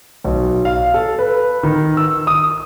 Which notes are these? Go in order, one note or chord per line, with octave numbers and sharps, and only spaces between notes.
B1
F5
A4
B4
D#3
E6
D#6